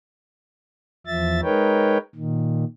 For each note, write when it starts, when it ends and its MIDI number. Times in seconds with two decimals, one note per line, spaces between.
1.07 1.41 40
1.07 1.41 53
1.07 1.41 76
1.07 1.41 93
1.43 1.98 56
1.43 1.98 63
1.43 1.98 70
1.43 1.98 71
1.43 1.98 73
1.43 1.98 79
2.15 2.64 46
2.15 2.64 51